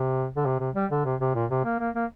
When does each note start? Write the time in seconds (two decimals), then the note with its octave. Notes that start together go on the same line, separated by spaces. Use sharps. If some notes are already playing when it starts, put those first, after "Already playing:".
Already playing: C3
0.36 D3
0.46 C3
0.60 C3
0.75 G3
0.91 D3
1.05 C3
1.20 C3
1.35 A#2
1.51 C3
1.65 A#3
1.80 A#3
1.95 A#3